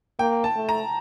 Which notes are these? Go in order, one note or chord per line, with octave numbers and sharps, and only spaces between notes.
A#3 G5
A5
A3
A#5